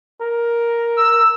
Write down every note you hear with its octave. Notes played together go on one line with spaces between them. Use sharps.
A#4
E6